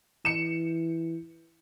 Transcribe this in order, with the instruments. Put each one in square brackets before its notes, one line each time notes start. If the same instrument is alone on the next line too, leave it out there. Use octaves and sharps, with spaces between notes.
[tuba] E3 [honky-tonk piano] C#7 E7